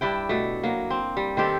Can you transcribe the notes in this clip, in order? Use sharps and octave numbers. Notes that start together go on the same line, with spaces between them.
G2 D4 E4 G5
B2 A3
F#3 A#3
C4
G3
D#3 C4 G4 A4